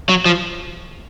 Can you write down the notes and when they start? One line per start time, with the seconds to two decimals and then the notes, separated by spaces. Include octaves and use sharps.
0.09 F#3
0.26 F3